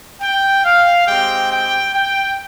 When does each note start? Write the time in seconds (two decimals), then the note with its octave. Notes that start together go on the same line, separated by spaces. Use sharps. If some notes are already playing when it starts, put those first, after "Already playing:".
0.22 G5
0.65 F5
1.08 G#3 C4 G4 G5
1.52 G5
1.95 G5